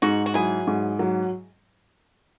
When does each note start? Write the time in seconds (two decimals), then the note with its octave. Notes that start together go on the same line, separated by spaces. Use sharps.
0.02 G#2 D#4 F#4
0.26 F#4
0.34 F#3 E4 G#4
0.67 G#2
0.99 F#3